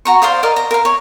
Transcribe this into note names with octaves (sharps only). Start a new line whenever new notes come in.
F#4 A#5 C#6
C5 D5 F5 D#6
A#4 D5 D#5 F5
A#5
A#4 F5
C#5